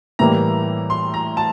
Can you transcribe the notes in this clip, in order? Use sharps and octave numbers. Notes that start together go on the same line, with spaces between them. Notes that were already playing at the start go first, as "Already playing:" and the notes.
A2 E3 G3 A#3 A#5
C6
A#5
A5